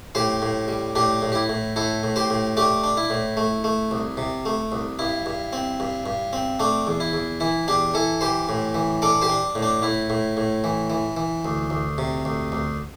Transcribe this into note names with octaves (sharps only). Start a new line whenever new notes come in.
A2 G4 C5
A2
G3
A2 D4 G4
A2
G4
E4
A2
A2 E4 A4
A2
G4 C5
A2
A3 D4 G4
D4
E4
A2
A3
A3
C2
C3
A3
C2
G2 E4
G2
C4
G2
G2
C4
A3 D4
E2
E4
E2
E3 E4
E2 D4 G4
E3 E4 A4
E3 G4 C5
A2
E3
D4 A4 D5
G4 C5
D4
A2
D4
A2 E4
A2
A2
E3
E3
E3
D2
D2
C3
D2
D2